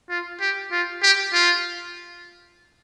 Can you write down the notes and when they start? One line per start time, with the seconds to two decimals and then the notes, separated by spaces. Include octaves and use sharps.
0.10 F4
0.41 G4
0.72 F4
1.03 G4
1.33 F4